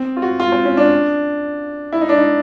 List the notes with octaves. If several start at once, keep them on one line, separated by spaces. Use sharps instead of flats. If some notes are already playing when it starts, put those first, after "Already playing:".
Already playing: C4
F4
F#4
F4
C4
C#4
D4
E4
D#4
D4
D#4